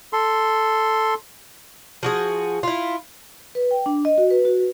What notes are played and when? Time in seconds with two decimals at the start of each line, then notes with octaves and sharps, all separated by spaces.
0.13 A4 C6
2.03 F3 F#4 G#4
2.63 E4 F4
3.55 B4
3.71 G5
3.86 D4
4.05 D#5
4.18 F#4
4.31 B4
4.45 F#4
4.60 B4